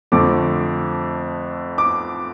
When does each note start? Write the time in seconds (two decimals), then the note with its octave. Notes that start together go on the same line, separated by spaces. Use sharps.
0.12 F2 D3 F3 A3 D6
1.78 D6